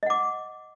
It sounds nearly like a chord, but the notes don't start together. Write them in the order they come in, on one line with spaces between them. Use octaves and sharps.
D#5 F#5 D6